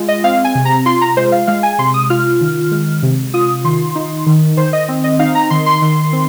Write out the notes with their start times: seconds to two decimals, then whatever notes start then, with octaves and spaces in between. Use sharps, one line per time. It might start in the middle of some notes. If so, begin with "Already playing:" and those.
Already playing: G#3 F4
0.08 D#5
0.24 C4 F5
0.44 G#5
0.55 C3
0.65 A#5
0.86 F4 C6
1.01 A#5
1.17 G#3 C5
1.32 F5
1.47 G#3 F5
1.63 G#5
1.78 C3 C6
1.94 D#6
2.10 F4 F6
2.41 D#3
2.71 G#3
3.03 C3
3.34 F4 D#6
3.65 D#3 C6
3.95 D#4
4.26 D#3
4.57 D#3 C5
4.73 D#5
4.88 C4
5.04 D#5
5.19 D#4 F5
5.35 A#5
5.50 D#3 C6
5.66 C6
5.82 D#3
6.13 C4